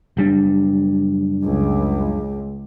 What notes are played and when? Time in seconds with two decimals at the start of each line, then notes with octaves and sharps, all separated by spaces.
0.17 F#1 G3 D4
1.44 C#2